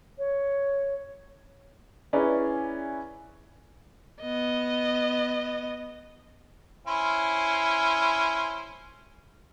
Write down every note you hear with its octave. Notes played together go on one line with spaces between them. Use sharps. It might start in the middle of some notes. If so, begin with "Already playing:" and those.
C#5
C#4 E4 G#4 B4 D5 A#5
B3 D#5
C#4 E4 C5